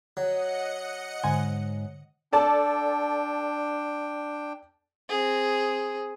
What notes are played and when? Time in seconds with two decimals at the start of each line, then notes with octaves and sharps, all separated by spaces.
0.17 F#3 D#5 F#5 C#7
1.24 G#2 D3 G#5
2.33 D4 A4 D5 G5 A5
5.09 C4 G#4